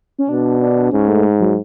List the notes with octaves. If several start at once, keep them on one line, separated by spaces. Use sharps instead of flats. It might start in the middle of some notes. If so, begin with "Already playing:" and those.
C#4
B2 D4
D4
G#2 C#4
A3
F#3